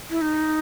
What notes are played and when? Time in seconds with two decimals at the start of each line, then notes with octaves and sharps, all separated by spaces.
0.10 E4
0.21 D#4